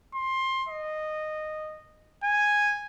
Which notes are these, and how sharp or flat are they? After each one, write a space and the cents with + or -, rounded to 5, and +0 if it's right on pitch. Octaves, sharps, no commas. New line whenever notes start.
C6 +20
D#5 -10
G#5 -5